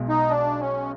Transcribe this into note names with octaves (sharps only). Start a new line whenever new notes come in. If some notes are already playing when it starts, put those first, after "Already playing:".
Already playing: B1 B2 G#3
D#4
D4
C#4